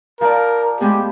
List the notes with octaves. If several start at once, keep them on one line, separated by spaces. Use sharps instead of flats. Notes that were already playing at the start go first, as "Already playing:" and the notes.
F3 A#4 D5
A2 G#3 B3 G4